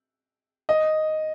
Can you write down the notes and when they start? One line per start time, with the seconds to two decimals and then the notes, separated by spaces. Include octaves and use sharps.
0.69 D#5